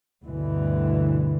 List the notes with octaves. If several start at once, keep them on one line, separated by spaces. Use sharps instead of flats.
D2 G2 B2 D3 E3